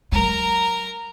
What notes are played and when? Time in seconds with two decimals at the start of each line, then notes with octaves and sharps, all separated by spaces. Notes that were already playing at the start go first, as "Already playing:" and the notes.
0.12 F#3 G#3 A#4 A#5